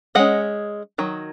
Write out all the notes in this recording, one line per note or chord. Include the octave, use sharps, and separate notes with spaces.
G#3 C#4 D#5 F#5
D#3 F#3